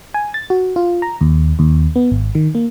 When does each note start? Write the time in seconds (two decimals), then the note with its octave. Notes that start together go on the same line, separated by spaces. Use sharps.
0.14 G#5
0.34 A6
0.50 F#4
0.76 F4
1.02 A#5
1.21 D#2
1.59 D#2
1.96 B3
2.12 G#1
2.35 D#3
2.55 A#3